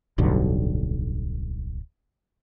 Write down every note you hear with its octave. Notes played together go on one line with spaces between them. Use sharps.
D1 B1 G2 D3